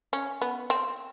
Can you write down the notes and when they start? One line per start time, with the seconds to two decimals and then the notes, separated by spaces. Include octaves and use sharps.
0.13 C#4
0.42 B3
0.70 C4